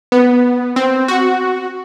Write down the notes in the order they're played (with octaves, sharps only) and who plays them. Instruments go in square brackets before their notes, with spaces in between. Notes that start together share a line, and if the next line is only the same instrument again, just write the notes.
[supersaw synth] B3
C4
F#4